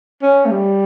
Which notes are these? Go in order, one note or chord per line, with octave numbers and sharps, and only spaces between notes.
C#4
A3
G3